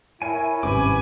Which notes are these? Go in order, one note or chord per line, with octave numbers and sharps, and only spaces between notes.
E4 A#4 C#5 G#5
G#1 G2 C3 C#4 B4 G#5 D6